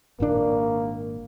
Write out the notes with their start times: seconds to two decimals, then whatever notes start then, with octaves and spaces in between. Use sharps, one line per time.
0.20 G#1 A#2 A#3 D4